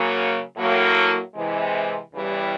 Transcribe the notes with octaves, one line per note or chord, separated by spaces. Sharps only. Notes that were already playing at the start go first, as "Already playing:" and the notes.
Already playing: C#3 F#3 A#3
A2 F#3 A#3
C3 E3 G#3
E2 C#3 E3 G3